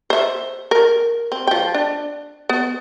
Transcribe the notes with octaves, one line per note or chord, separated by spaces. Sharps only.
C5 E5
A#4
C4
F3 G5
D4
B3